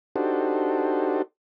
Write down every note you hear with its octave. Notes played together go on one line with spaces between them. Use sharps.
D4 D#4 F#4 G4 A4 C5